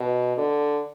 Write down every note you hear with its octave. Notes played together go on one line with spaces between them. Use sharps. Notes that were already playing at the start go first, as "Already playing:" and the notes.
Already playing: B2
D3